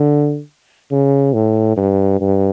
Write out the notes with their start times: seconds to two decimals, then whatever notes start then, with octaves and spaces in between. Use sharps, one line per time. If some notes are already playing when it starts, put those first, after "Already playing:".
Already playing: D3
0.92 C#3
1.34 A2
1.77 G2
2.21 G2